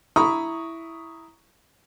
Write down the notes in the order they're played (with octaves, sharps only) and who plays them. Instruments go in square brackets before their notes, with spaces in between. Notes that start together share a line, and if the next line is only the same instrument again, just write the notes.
[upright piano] E4 A#5 B5 C#6 D#6